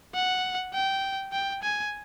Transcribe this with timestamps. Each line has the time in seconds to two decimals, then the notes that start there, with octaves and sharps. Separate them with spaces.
0.15 F#5
0.74 G5
1.32 G5
1.63 G#5